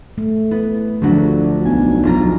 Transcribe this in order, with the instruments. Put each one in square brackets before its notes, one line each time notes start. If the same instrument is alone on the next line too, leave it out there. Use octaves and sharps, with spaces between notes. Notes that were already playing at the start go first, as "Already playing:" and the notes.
[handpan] A3
[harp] B3 [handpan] E4
[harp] D2 F#3 [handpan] F3 A3 D4
[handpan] F4
[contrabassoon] B1 [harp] G#5
[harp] F1 F4 A#5